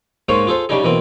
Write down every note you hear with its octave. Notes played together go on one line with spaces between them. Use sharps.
G#2 G#3 A#3 C5 C#5 F5
F4 G#4 A4 C5
C#3 G3 D4 D#4 G#4
B2 E3 A#3 C4